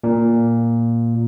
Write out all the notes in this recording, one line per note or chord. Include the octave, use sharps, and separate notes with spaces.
A#2